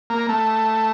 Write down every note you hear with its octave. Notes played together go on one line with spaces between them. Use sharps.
A#3
A3